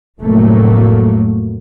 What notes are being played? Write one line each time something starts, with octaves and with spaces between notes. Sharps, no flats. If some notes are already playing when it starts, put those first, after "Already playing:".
F1 A2 F#3 A3 A#3